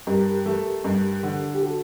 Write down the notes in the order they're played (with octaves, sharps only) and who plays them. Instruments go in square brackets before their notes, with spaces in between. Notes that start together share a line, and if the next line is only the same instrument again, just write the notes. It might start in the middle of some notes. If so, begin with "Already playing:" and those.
[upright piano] G2 [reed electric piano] G4 A#4
[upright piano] A3
G2
D3
[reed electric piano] G4
F#4 A4